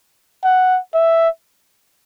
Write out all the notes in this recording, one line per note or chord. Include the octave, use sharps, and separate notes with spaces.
F#5
E5